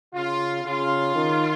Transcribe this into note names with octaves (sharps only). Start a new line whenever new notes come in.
C#3 F4
C#3 F4
D#3